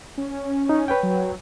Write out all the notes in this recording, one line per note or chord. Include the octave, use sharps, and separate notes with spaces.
C#4
D#4
B4 C#5 G5
F#3